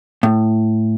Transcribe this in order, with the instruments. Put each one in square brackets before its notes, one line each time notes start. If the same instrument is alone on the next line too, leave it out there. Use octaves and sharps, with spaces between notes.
[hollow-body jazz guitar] A2